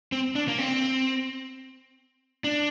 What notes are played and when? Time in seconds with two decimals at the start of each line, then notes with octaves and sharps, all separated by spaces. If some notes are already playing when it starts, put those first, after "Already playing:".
0.12 C4
0.35 D4
0.48 A#3
0.58 C4
2.44 D4